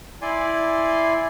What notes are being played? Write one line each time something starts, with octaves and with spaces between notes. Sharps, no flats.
E4 D5 G#5 C6